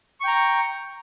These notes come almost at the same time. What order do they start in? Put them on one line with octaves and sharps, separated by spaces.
C#6 G5 A#5